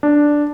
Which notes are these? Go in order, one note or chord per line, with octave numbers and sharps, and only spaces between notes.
D4